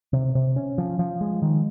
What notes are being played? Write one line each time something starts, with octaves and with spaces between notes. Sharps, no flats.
C3
C3
C#4
F3
F3
G#3
D#3